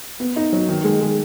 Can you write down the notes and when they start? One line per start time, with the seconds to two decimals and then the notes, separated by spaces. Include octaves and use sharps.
0.20 B3
0.36 D#4
0.53 F#3
0.69 D#3
0.84 G#3
1.01 G#3